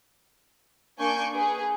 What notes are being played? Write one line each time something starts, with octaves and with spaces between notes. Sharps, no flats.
A#3 D4 G#5 C#6 G6 D7
G#4 B4